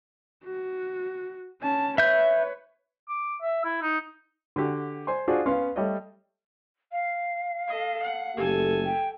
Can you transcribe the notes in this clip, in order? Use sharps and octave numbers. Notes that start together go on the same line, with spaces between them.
F#4
C#4 A5
B4 C#5 E5 G6
D6
E5
E4
D#4
D3 F#4 G4
C5 G#5 C6
D4 F4 F#4 G#4 C5
B3 C#4 F5 C6
G3 A3 C#5 D#5
F5
A4 D#5
F#5
F#1 A3 G4 A4 G#5
G5